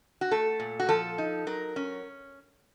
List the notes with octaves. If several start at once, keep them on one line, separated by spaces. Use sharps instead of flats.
F#4
A3 A4
A#2
F#4
F3 A4
D#4
F#3 A#4
C#4